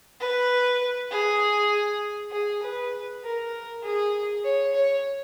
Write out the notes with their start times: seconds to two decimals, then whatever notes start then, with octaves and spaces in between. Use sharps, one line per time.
0.20 B4
1.11 G#4
2.31 G#4
2.62 B4
3.23 A#4
3.83 G#4
4.43 C#5
4.74 C#5